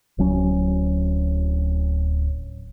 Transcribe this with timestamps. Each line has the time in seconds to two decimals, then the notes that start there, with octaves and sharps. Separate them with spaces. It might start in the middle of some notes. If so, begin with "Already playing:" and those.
0.18 D1 F#3 C#4